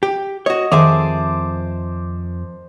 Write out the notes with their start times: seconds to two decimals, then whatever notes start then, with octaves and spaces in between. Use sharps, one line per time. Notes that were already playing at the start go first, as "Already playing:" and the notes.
0.03 G4
0.46 F#4 C#5 D#5
0.72 F2 D#3 G#4 C5 E5 A5 D6